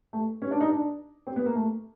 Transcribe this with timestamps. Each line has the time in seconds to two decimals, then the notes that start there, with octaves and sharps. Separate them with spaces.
0.13 A3
0.42 C#4
0.51 D4
0.61 D#4
0.70 D4
1.27 C4
1.36 B3
1.46 A#3
1.55 A3